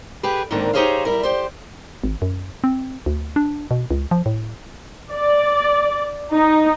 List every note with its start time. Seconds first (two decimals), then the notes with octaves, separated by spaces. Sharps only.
0.23 G4 G#4 B4
0.51 G#2 D3 D#3 A#3 C4 D4
0.73 D#4 G4 G#4 C5 C#5 F5
1.05 G3 E4 A#4
1.23 G4 C5
2.04 G#1
2.22 F#2
2.64 C4
3.06 D2
3.36 D4
3.71 B2
3.91 C#2
4.11 F3
4.26 A2
5.13 D5
6.33 D#4